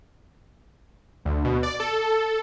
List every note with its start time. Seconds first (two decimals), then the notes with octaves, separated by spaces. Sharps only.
1.25 D2
1.45 B2
1.63 D5
1.80 A4